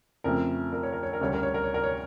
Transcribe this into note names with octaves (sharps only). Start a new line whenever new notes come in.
F2 C#3 F3 A3 A#4
A#4
C#5
A#4
C#5
A#4
D2 C#3 G3 C#5
A#4
C#5
A#4
C#5
A#4
C#5